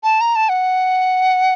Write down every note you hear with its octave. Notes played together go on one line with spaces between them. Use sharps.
A5
A#5
A5
F#5